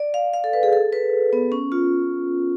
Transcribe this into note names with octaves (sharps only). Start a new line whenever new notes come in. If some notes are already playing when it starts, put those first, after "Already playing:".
Already playing: D5
F5
F5
A4
B4
G#4
A4
B4
B3
C#4
F4